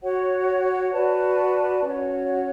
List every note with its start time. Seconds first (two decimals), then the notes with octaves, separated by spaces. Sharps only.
0.01 F#4 C#5 F#5
0.92 F#4 B4 D5 A5
1.84 C#4 F#4 C#5